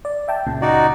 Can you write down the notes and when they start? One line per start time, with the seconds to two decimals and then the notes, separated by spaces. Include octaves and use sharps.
0.05 D5
0.28 E5 G5 A5
0.46 C#2 A#2 C#3
0.62 D#4 F#4 D5